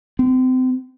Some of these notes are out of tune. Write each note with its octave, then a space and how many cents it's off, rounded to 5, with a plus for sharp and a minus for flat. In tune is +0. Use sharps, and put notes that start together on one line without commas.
C4 -35